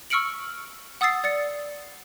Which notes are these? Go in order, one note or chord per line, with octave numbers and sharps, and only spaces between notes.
C#6 E6 F6 C#7 D7 F#7
F#5 D#6 E6 A6 C7
D5 A6 C#7